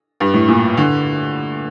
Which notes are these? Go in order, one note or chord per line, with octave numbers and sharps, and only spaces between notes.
G2
A2
A#2
D3